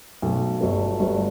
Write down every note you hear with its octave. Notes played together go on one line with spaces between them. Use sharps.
B1 B2 A3
G1 G2 F#3 A3
G1 G2 F#3 A3